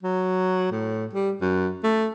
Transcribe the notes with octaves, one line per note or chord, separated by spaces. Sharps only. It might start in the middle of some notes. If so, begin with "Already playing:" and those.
F#3
A2
G3
F#2
A3